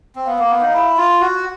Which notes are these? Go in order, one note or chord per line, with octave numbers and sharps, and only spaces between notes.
C4
B3 F5
A#3
B3
D#4
E4
F4
F#4 F#5